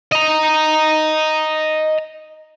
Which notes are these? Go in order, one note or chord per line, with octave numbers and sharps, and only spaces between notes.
D#5 A#5